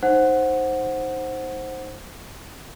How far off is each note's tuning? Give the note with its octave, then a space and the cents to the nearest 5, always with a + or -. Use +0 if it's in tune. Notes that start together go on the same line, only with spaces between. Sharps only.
D#4 +0 C5 +10 F#5 -5